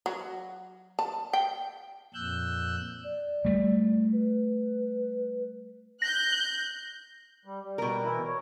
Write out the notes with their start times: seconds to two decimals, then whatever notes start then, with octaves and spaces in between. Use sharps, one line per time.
0.06 F#3
0.99 A5
1.33 G5
2.14 F2 A#2 E6 F#6 G6
3.04 D5
3.45 G3 A3
4.12 B4
6.02 F#6 G6 A#6
7.45 G3
7.63 G3
7.78 B2 A#4
8.04 E3 E4
8.27 C#5